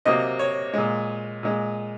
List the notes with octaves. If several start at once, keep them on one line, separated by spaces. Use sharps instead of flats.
C3 F#3 A#3 D#5
C#5
A#2 G#3
A#2 G#3